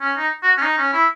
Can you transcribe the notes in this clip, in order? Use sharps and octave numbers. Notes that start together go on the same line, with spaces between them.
C#4
D#4
F#4
C#4
D#4
C#4
E4